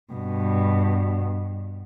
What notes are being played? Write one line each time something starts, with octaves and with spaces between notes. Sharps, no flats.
G2 B2